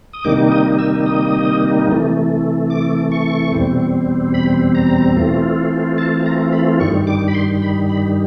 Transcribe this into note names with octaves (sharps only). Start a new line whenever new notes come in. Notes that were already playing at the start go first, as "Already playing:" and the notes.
D#6
C3 D#3 G3 A#3 D#4 D6
D#6
E6
D#6
C3 E3 A3
D6
C#6
E2 B2 G3 C4
B5
A#5
E3 A3 C4 F4
A5
A#5
B5
G2 D#3 G3 C#6
D6
B5
C6
B5
B5